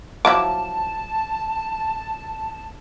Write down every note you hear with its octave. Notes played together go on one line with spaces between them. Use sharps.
F3 F#3 E4 A5 D6